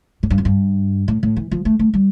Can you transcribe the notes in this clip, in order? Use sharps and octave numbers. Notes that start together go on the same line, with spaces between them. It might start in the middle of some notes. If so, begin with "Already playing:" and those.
A2
G2
F2
G2
A2
A2
E3
F3
A3
A3
G3